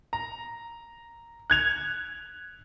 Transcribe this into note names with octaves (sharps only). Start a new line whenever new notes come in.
A#5
F#6 G#6 F7